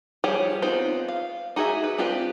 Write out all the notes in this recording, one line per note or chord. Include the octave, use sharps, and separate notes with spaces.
F3 G3 G4 G#4 C#5
B3 C4 D#4 F4 C5
F5
D#4 F#4 G#4 A#4 E5
B4
C4 D4 F4 G4 B4